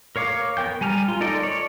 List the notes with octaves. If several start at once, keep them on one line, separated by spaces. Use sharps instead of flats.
A#4 C#5 F5 D6
B3 A#4 G5 G6
G3 G#5 A#5 F6
F4
D#4 A4 A#4 D5
C#5 D5